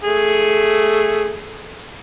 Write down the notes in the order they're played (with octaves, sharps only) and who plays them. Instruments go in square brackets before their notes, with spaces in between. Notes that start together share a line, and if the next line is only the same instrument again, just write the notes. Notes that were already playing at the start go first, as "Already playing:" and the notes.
[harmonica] A3 G#4